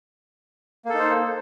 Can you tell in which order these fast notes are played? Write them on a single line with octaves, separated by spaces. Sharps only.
A#3 A4 D#4 C5